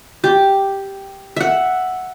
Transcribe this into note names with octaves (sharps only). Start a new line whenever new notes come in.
G4
E5 F#5